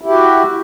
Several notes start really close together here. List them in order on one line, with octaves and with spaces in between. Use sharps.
E4 G4 F#4